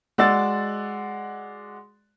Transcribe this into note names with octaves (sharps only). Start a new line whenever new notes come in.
G#3 F#4 D5 E6 A6